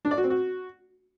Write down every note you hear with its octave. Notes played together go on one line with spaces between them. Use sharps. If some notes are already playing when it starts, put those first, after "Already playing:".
D4
D5
F#4
C4
F#4